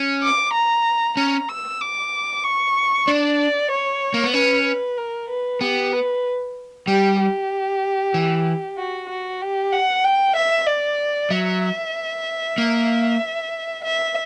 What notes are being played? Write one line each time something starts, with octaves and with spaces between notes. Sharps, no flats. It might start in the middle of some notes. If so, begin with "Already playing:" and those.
Already playing: C#4
D6
A#5
C#4 A#5
E6
D6
C#6
D4 D5
C#5
A#3
B3
C#4 B4
B4
A#4
B4
B3 G4
B4
G3 G4
G4
E3
F#4
F#4
G4
F#5
G5
E5
D5
F#3 E5
A#3
E5